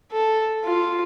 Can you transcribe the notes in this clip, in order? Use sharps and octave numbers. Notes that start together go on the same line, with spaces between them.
A4
F4